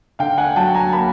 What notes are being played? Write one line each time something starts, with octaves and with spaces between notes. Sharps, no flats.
D3 F5 G5
F#5 G#5
F#3 G5 A5
G#5 A#5
A#3 A5 B5